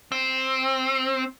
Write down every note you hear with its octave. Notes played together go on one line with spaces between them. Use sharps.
C4